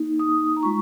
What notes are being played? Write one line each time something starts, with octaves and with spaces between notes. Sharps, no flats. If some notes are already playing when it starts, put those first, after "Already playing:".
Already playing: A#3 D#4
D#6
A#5
G#3 F4 C#6